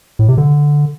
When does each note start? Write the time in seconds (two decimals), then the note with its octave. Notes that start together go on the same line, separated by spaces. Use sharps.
0.19 A2
0.28 C3
0.38 D3